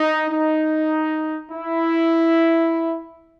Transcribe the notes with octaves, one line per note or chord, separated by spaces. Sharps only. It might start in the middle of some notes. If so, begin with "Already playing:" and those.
Already playing: D#4
D#4
E4